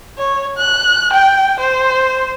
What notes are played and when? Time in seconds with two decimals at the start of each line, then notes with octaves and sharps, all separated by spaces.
0.18 C#5
0.58 F#6
1.13 G5
1.60 C5